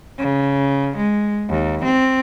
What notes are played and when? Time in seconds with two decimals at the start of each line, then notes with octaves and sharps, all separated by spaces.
0.18 C#3
0.97 G#3
1.50 D#2
1.84 C4